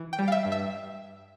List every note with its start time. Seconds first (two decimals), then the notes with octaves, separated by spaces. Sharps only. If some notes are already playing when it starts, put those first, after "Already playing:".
Already playing: E3
0.13 G5
0.19 G3
0.28 F5
0.32 E5
0.45 G2
0.52 E5